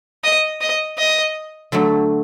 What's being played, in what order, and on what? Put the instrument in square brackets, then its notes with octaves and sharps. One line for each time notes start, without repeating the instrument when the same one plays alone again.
[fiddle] D#5
D#5
D#5
[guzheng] D3 F#3 A3